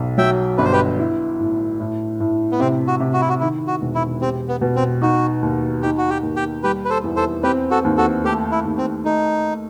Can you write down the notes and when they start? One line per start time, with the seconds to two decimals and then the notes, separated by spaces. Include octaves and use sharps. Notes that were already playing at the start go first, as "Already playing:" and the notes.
Already playing: B1
0.18 F#3 E5 G5
0.58 G1 B4
0.65 C5
0.72 G4 B4
0.99 E4
1.39 A2
1.80 A2
2.20 A2
2.52 B3
2.59 C3 C4
2.87 F#4
3.00 C3
3.13 F#4
3.21 E4
3.29 F#4
3.40 D#3 E4
3.67 F#4
3.81 E1
3.95 E4
4.21 C4 G4
4.48 B3
4.61 B2
4.76 C4
5.01 D#4 F#4
5.42 D#2
5.82 D#4 G4
5.98 F#4
6.10 G4
6.23 D#2
6.36 G4
6.63 G3 G4 B4
6.85 B4
6.90 A4 C5
7.04 E2
7.16 A4 C5
7.43 C4 G4 B4
7.70 F#4 A4
7.84 D#2
7.97 F#4 A4
8.24 A3 G4
8.52 E4
8.65 D#2
8.78 C4
9.05 A3 D#4